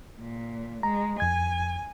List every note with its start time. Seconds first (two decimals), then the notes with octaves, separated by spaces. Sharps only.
0.19 A#2
0.83 G#3 A#5
1.20 F2 G#5 G#6